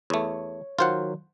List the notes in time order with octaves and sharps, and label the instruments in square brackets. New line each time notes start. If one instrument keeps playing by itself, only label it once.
[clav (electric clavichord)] E2 A3 [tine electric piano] C#5
[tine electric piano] D#3 F#3 [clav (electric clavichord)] F4 C5 F#5